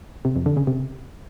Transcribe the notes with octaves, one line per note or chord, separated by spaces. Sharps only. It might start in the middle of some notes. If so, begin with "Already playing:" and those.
C3
F2
D3
C#3
C3